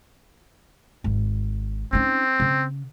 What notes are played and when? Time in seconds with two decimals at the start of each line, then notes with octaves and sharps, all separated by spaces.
1.04 G#1
1.93 C4 C#4 D#4
2.40 C#3